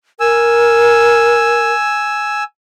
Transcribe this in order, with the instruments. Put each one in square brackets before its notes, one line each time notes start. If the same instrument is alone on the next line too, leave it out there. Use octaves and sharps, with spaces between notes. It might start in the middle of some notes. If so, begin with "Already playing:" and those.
[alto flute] A#4 [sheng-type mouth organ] G#5 E6